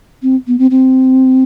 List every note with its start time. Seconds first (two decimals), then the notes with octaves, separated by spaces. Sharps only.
0.23 C4
0.47 B3
0.59 C4
0.71 C4